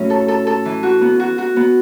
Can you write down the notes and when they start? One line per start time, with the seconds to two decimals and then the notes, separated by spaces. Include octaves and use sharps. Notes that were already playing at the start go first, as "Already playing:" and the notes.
Already playing: A2 F#3 A3 C#4
0.10 A4
0.28 A4
0.47 A4
0.65 E3
0.83 F#4
1.01 B3
1.20 F#4
1.38 F#4
1.56 B3